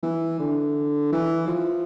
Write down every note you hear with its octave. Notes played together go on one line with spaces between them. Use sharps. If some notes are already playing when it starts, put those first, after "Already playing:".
E3
D3
E3
F3